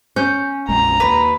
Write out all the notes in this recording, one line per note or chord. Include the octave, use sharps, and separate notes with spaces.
C#4 G6
A#1 F2 G#3 A#5
D#2 B4